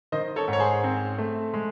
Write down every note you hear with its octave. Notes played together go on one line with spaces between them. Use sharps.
D#3 C5 D#5
A4 C#5
G#2
C#5
G#4 C5
C4
A3
G#3